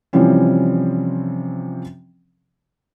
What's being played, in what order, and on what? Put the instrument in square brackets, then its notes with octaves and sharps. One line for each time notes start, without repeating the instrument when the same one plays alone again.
[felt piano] C3 E3 F3 G3 C4 C#4